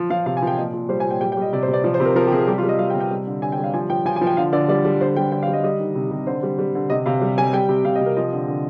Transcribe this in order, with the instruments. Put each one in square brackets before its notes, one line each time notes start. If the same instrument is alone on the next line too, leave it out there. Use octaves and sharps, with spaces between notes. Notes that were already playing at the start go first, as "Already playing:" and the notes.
Already playing: [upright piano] F3
F3 F5
C3 F5
G#5
F3 G5
A#2 D#5
A#2
G3 C5
G#5
A#2
G5
G3 G5
G5
G3 D#5
C3 D5
C5
C3
D5
F3 D5
C5
C3
A#4
F3 A#4
G4
C3 G#4
G3 G4
F4
G3
D#5
G3 F5
G5
C3
G5
G3
D3
D3 G#5
G5
G3
F5
F3 G#5
F3 G5
F3 G#5
G#5
F3
G5
D3 F5
D3 D5
G3 D5
G3
D3 C5
G3 G5
D3 G5
F5
G3
D#5
G3 D#5
D#3
C3
C3
D3 C5
G3
G3
D3
C3 D#5
C3 F5
G3
G3 G#5
G3 G5
C3
C3 F5
D#5
C3
A#4
F3 D#5
D3
D3